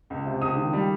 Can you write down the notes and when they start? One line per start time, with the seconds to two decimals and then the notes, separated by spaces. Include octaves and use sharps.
0.10 C#2
0.26 C3
0.41 C#2 D#6
0.56 D#3
0.73 G3